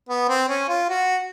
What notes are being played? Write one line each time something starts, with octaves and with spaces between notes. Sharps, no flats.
B3
C4
C#4
F4
F#4